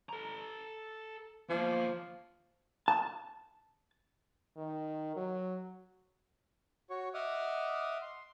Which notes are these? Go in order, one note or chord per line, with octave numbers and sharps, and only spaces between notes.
A4 A#5
E2 F3 A#3
A5
D#3
F#3
F#4 C#5 C#6
D#5 E5 F#5 D6 D#6 F6
C6